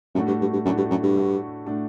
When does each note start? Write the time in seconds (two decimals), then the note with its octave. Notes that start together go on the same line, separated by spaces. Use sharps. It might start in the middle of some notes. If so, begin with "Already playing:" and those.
0.15 F#2 A2 A3 D4 F#4
0.27 G2
0.41 G2
0.53 G2
0.65 F#2 A2 A3 D4 F#4
0.77 G2
0.90 F#2
1.03 G2
1.15 A2 A3 D4 F#4
1.66 A2 A3 D4 F#4